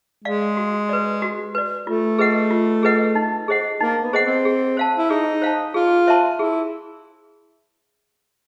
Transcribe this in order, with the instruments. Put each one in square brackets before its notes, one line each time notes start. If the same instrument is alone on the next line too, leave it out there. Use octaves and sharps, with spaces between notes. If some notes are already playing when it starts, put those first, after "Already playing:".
[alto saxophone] G#3 [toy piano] D5 F5
[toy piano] F#4
B4 D5
F#4
B4 D5
[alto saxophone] A3 [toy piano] F4
[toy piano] G#4 B4 D#5 F#5
F4
G#4 B4 D#5 F#5
D#4
G#4 C5 D#5 F#5
[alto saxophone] A#3 [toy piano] D#4
[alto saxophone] B3
[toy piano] G#4 C5 D#5 F#5
[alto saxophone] C4
[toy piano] G#4
C5 F5 A5
[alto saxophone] E4
[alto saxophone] D#4 [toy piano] G#4
[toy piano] C5 F5 A5
[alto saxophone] F4 [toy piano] G#4
[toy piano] C5 E5 A5 C6
[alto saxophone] E4 [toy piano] G#4